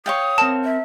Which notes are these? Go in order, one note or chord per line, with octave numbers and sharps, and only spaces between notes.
C#5 F5 G5 D#6
C4 A#4 A5
E5